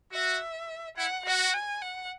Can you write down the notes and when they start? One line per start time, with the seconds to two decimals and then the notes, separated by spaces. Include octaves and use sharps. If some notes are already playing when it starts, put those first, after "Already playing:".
0.12 F#4 E5
0.97 E4 F#5
1.25 F#4 F#5
1.54 G#5
1.82 F#5